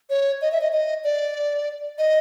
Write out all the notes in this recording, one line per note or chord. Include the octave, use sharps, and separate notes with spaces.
C#5
D#5
E5
D#5
D#5
D5
D#5